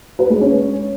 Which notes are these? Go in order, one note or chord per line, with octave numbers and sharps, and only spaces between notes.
B4
G#3
C#4